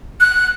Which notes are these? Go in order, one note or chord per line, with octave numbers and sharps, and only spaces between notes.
F#6